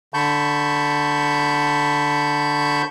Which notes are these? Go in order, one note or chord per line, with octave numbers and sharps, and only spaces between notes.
D3 A5 B5 C#6 G6